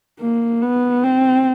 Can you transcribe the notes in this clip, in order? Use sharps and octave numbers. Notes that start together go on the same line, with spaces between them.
A#3
B3
C4